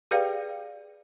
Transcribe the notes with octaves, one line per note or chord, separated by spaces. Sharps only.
G4 G#4 B4 D5 F5 G5